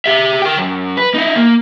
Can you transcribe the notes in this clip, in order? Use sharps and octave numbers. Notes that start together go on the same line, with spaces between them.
G4 E5
A#4 G5
F#2
B4
D#4 E4
A#3